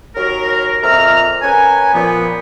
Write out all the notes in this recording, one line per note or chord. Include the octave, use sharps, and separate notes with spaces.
D#2 F#3 F#4 A#4
F2 A#2 E5 A#5 F6
C#4 A#4 B4 G#5
A#2 F3 B3